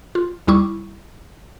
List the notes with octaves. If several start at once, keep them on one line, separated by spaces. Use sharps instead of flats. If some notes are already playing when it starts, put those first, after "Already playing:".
F4
D#2 G3 E4 C#6 D6